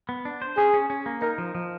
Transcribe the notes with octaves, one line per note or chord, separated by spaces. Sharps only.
B3
D4
C5
C#4 G#4
C#4
C#4
A#3
D#4 A#4
F3
F3